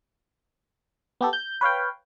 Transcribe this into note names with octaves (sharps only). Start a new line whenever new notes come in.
B3 G4 A4
G6
B4 C#5 F5 G5